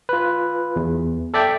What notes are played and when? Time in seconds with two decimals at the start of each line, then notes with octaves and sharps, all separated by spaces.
0.09 F4 B4
0.76 E2
1.34 A4 D5 E5 G5